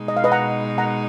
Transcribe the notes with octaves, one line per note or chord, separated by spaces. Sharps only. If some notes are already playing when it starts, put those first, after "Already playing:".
Already playing: B2 G#3 D#4
D#5
F5
B4 D#5
F#5 A#5
F#5 A#5